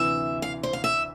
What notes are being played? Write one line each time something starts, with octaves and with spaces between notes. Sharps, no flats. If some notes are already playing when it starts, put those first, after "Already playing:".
Already playing: D2 C3 E3 E5
F5
C5
F5
E5